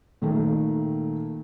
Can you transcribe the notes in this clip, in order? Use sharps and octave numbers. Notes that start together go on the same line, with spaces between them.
A#2 D#3 A3